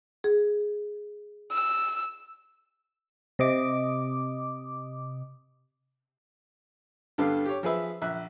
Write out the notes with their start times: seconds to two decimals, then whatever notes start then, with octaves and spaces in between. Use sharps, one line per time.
0.24 G#4
1.52 E6
3.39 C3 D#5 D6
7.18 G2 D3 B3 G4 A4 F5
7.46 G4 C#5
7.63 F3 G#4 B4 E5
8.02 A#1 E5 F#6